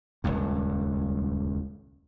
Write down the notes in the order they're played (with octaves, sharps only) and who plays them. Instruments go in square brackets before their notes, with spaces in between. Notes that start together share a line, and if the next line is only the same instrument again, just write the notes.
[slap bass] D#1 G#1 C#2 G2